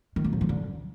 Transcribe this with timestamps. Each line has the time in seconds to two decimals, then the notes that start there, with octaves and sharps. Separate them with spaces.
0.16 D#3
0.24 F#2
0.33 A2
0.41 F3
0.49 D3